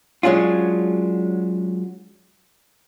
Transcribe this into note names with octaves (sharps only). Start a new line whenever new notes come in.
F#3 G#3 C#4 D4 F4